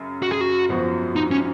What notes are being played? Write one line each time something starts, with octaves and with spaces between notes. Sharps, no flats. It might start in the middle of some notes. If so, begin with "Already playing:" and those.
Already playing: F#2 C#3
F#4
G#4
F#4
G#1 F#2 F3 B3 F#4
D#4
C#4